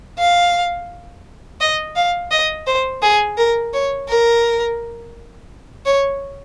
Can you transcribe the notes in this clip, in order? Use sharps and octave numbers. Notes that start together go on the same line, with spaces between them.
F5
D#5
F5
D#5
C5
G#4
A#4
C#5
A#4
C#5